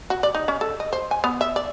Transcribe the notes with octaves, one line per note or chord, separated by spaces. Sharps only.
F#4
D5
D#4
C#4
A4
D#5
C5
G#5
B3
E5
D5